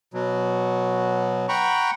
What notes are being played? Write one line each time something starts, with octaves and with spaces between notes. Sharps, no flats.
B2 F#3
F#5 G5 A#5 B5 C#6